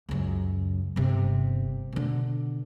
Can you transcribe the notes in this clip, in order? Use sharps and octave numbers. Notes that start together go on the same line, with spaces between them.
C#2 F#2
G1 C3
B2 D3